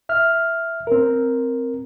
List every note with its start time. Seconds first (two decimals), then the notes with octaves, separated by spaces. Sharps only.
0.09 E5 F6
0.87 C4 A#4